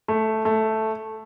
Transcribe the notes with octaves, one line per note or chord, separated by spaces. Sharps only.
A3
A3